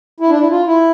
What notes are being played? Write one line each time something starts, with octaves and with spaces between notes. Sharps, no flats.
E4
D4
E4
F4
E4